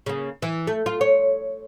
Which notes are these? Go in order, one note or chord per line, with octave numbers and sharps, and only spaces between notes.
C#3 A#3
E3
A3
F4
C#5